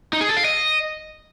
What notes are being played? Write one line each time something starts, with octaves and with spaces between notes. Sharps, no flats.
D#4
G#4
A4
F5
D#5